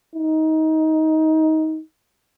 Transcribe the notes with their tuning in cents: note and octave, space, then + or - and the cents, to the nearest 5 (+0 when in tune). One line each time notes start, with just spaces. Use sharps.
D#4 +20